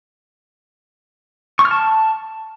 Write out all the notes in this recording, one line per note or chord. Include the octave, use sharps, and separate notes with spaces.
C#6
F6
A5